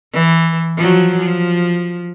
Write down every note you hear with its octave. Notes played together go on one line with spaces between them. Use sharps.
E3
F3 F#3
F3